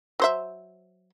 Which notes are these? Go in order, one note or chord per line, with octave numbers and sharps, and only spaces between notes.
F#3 C5 E5